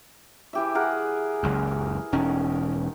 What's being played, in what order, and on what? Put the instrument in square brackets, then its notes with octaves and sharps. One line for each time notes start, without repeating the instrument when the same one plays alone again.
[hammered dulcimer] E3 G4 E5
G#4 A#4 F#5
[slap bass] F#1 C#2 F#2
[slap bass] E1 C#4 [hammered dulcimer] D#3